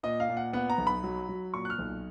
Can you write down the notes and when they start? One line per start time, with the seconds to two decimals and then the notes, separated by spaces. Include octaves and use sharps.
0.03 A#2 D#5
0.20 F5
0.29 A#2
0.37 F#5
0.53 B3 F#5
0.70 A#5
0.78 B1
0.87 B5
1.03 F#3
1.29 F#3
1.54 A#2 C#6
1.65 F#6
1.70 F6
1.79 B1